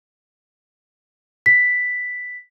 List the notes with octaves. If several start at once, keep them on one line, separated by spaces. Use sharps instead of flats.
B6